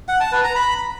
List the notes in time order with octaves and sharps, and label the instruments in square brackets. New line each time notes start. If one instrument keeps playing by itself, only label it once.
[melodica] F#5
A5
B4
A#5
B5